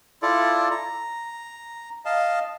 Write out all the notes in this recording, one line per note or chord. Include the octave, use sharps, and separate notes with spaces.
E4 F4 A4 D5
A#5
D#5 F5 A5